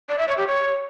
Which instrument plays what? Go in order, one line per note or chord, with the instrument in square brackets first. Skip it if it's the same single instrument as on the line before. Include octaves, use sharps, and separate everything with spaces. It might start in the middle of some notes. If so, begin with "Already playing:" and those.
[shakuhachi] D5
E5
C#5
G4
C#5